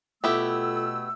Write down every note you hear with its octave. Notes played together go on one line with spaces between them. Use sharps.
B2 A3 B3 E4 F4 G4 A4 E6